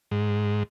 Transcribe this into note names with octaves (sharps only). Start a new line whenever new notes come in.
G#2